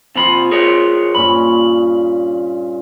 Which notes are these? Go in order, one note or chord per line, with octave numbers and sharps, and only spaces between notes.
C3 F3 C4 B5
G#4 A#4 C#5
G2 A#2 C#4 B5